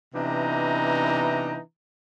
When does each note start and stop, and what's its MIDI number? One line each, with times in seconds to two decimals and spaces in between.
0.15 1.60 48
0.15 1.60 52
0.15 1.60 59
0.15 1.60 62
0.15 1.60 63
0.15 1.60 82